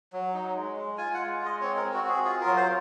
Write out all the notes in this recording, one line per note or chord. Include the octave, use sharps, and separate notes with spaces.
F#3
D#4
G#3
G#3
F4 G#5
G#3 F#5
G#3
D#5
C4 C#5
A#4
C4
F#4
F#4 G#4
F4 G#4
A#4
F#3
C5